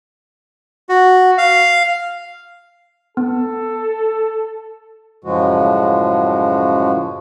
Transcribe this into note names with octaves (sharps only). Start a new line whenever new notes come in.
F#4
F5
B3 A4
F#2 A2 C#3 F3 G#3 F#4